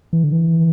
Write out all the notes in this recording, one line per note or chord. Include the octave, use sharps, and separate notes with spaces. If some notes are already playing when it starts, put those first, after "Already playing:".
E3
D3
E3